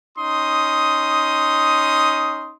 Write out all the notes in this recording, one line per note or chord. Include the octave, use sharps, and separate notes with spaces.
C#4 D#4 C6 D#6